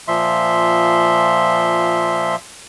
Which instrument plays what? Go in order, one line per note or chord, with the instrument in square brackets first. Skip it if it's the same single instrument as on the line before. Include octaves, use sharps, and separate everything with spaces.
[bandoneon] A#2 F3 E5 C6